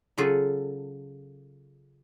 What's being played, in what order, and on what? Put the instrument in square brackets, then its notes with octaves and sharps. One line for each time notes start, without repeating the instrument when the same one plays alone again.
[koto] C#3 F#3 F4 G#4 A4